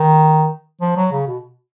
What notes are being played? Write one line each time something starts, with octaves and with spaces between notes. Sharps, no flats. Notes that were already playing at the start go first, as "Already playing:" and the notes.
Already playing: D#3
F3
F#3
C#3
B2